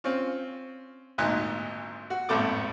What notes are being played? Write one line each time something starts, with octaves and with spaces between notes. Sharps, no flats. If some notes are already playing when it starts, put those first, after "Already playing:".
C4 C#4 F4
G#1 D2 A#2 D#4 F#6
F#4
G#1 F2 A2 B3 A4 D6